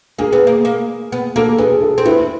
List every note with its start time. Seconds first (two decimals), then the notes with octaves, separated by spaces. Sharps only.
0.18 A#3 G#4
0.33 B3
0.47 A#3
0.65 A#3
1.12 B3
1.36 A#3 A4
1.58 B3 G#4
1.82 A4
1.98 C4
2.05 B3 E4